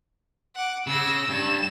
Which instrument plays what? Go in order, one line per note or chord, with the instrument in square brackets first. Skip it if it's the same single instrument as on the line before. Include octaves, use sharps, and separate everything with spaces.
[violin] F#5 D6
[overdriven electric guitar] C#3 [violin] E6 A#6
[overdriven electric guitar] G2 [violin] E7